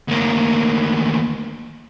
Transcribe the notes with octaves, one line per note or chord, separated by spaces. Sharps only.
D2 A#3